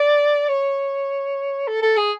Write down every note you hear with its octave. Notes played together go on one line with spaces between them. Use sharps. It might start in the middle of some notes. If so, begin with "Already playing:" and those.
Already playing: D5
C#5
A4
A4
G#4